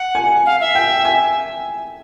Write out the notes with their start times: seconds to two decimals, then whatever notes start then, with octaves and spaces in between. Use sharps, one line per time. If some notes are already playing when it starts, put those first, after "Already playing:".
Already playing: F#5
0.15 G#5
0.45 F5
0.60 E5
0.75 G5
1.05 G#5